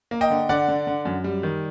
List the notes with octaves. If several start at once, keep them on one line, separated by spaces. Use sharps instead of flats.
A#3
D#5 G5
D3
D3 D5 F#5
D3
D3
F#2
G3
D#3